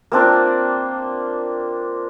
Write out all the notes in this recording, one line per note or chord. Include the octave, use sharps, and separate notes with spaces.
A#3 C4 D4 F4